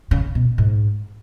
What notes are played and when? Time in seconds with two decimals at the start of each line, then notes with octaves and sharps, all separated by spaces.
0.11 C#3
0.35 B2
0.58 G#2